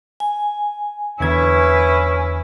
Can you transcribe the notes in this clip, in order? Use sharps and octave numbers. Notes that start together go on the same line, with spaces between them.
G#5
E2 D3 C#4 E4 B4 G#6